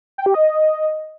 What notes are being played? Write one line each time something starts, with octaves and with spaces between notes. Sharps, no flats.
G5
G4
D#5